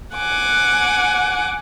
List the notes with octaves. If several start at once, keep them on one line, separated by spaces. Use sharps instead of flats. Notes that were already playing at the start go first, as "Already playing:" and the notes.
F#5 G#5 D6